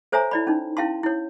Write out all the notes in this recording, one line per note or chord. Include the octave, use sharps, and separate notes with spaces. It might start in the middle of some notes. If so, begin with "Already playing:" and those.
A4 C5 C#5 E5 G#5 A#5
E4 D5 B5
C#4 D#4
C#4 E4 F5 A5 C6
E4 C#5